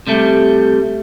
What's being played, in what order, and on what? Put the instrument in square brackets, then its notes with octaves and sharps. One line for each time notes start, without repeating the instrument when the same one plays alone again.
[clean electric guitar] C3 G3 A3